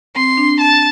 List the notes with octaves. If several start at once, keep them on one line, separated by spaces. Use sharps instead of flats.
C4 C6
D4
A5